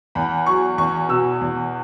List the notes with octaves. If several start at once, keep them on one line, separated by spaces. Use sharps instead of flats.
E2 B5
F#3 C#6
E2 C#6
B2 E6
E2